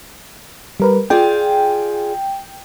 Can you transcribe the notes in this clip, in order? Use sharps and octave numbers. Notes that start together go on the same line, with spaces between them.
G3 A#4 B4
F4 G#4 D5 G5